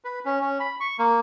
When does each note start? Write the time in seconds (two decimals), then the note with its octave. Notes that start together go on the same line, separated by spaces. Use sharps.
0.04 B4
0.25 C#4
0.41 C#4
0.60 B5
0.80 C#6
0.99 A#3